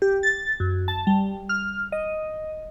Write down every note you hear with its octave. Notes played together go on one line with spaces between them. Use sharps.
G4
A6
F#2
A5
G3
F6
D#5